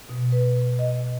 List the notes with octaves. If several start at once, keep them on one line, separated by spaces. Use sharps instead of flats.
B2
B4
D#5